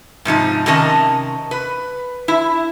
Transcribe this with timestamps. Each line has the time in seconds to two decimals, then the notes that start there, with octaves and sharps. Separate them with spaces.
0.25 G#2 C3 F3 D#4
0.66 C3 D#3 C#4 A#4 D#5 A5
1.51 B4
2.28 E4